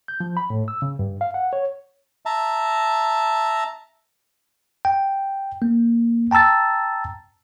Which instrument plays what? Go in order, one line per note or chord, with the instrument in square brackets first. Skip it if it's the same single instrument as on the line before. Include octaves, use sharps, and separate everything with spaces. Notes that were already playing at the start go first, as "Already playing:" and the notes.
[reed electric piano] G6
F3
B5
A2
E6
C#3
G2
F5
F#5
C#5
[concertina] E5 A5 A#5
[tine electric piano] G5
A#3
G5 A5 A#5 E6 A6